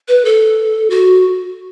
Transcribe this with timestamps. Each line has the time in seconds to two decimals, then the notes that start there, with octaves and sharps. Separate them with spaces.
0.08 B4
0.25 A4
0.90 F#4